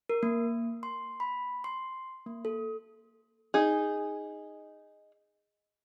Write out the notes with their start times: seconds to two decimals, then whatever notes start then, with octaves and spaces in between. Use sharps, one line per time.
0.09 A#4
0.23 A#3
0.83 C6
1.20 B5
1.64 C6
2.26 A#3
2.45 A4
3.54 D#4 G#4